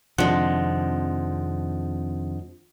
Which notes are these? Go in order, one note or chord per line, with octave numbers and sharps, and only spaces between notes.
F2 C3 D#3 F3 G#3 D4 F#5